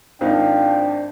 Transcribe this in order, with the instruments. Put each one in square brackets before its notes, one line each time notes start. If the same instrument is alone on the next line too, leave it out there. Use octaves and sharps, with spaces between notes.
[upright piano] G#1 D#4 [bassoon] F3 [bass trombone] D4 [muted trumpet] G5